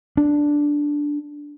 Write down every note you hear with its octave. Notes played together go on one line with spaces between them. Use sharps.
D4